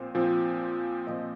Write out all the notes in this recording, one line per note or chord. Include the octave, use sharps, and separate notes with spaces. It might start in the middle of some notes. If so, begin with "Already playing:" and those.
Already playing: A#2 F3 C4 C5
A#2 F3 C4
A#2 F3 C4 D#5